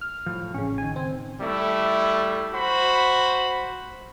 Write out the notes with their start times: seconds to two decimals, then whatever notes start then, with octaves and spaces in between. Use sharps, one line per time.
0.01 F6
0.26 A2 F3
0.54 A1 C#3 C#4
0.78 D#3 G#5
0.96 C4
1.41 G3 A3 E4
2.54 F#4 C5 B5